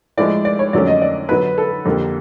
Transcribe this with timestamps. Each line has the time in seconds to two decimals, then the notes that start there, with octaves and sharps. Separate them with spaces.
0.17 A2 F3 G#3 D5
0.45 D5
0.59 C#5
0.73 F2 D3 F#3 A3 C#4 D5
0.87 D#5
1.02 D5
1.29 D3 F#3 B3 B4
1.58 A4
1.85 F2 D3 G3 A#3